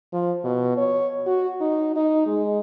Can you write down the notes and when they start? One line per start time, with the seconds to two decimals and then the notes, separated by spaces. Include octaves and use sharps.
0.13 F3
0.44 B2
0.77 C#5
1.27 F#4
1.61 D#4
1.96 D#4
2.26 G#3